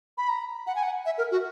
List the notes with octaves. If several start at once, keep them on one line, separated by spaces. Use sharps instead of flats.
B5
A#5
F#5
G#5
F#5
E5
A#4
F#4